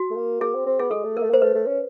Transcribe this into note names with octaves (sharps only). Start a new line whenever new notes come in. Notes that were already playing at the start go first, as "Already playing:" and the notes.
Already playing: F#4
A3
A#3
A#3 G#4
C4
C4
B3 G#4
G#3 A4
A3
A#3 A#4
A3
A#3 C5
A3 B4
A3
C#4